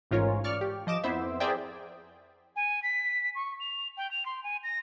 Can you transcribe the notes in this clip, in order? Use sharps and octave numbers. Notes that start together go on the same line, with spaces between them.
A1 G#2 C#4 F4 A#4 C#5
D5 C#6 F6
G4
F3 D#5 D6 E7
F2 B3 E4 C5 E5
G#4 A#4 C5 D5 E5 G5
G#5
B6
C#6
F7
G5
F7
C6
G#5
A#6